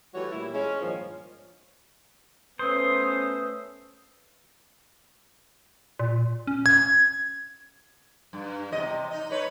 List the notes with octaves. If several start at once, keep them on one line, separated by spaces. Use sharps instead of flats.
E3 G3 A3 F#4 C#5
A#2 G3 E4
G#3 C#4
G2 A#2 D#3 F3
A3 B3 C#4 B4 C5 D#6 E6
A#2
C#4
G#6
G2
E2 C3 D#5
C3
D#4 D#5
D#4 B4 C#5